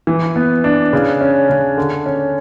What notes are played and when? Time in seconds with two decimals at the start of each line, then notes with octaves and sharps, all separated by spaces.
0.07 E3
0.36 B3
0.64 D4
0.93 C#3
1.21 C#4
1.49 C#3
1.77 D3
2.06 C#4